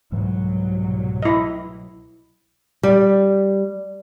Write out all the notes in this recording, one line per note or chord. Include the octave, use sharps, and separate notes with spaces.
C2 G#2 B2 E3 F#3
E4 D#5
G3